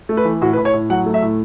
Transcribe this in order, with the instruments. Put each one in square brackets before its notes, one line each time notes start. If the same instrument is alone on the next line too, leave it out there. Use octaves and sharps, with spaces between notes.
[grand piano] A3
B4
E3
A2 F#4
B4
A2
C#5
A2
F#3 F#5
A3
E5
A2